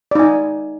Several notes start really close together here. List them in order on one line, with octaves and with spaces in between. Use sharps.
D5 D#4 G#5